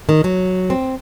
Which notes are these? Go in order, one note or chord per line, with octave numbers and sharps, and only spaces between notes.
D#3
F#3
C4